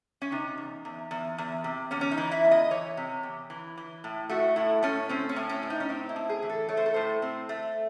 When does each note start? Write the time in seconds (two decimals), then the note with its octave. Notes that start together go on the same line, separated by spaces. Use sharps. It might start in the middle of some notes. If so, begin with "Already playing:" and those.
0.22 C#4
0.32 C3 D#4
0.57 E2
0.85 E2
1.11 E2
1.38 E2
1.64 C3
1.91 E2 C#4
2.01 C#4
2.11 D#4
2.18 E3
2.31 E4
2.45 E2
2.51 D#5
2.71 E3 C#5
2.97 C3
3.23 E2
3.50 E3
3.77 E3
4.04 A2
4.29 A3 F#4
4.56 A2 E4
4.83 A3 C#4
5.09 C4 C#4
5.29 C#4
5.36 A2
5.50 C#4
5.63 A2
5.70 D#4
5.80 C#4
5.89 C4 D#4
6.09 E4
6.16 A2
6.29 G#4
6.42 E3
6.49 A4
6.69 A3 C#5
6.77 C5
6.86 A4
6.94 A2 C5
7.22 C4
7.49 A3